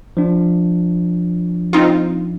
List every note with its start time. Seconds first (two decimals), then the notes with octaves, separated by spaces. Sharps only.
0.17 F3 D4
1.73 C4 D#4 F4